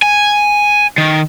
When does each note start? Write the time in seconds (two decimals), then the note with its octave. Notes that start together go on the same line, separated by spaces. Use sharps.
0.02 G#5
0.98 D#3